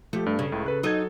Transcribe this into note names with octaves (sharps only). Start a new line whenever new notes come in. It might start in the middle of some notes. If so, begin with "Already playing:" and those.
F3 A3 G4
G2
C#3
C#2 A2
A4 B4 F#6
F#3 D#4 A4 D#5 G#6